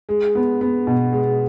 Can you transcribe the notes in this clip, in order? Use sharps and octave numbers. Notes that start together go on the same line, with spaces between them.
G#3
B3
B3
B2
G#3